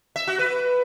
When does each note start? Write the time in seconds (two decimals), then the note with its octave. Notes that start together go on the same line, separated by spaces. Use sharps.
0.16 E5
0.27 F#4
0.39 B4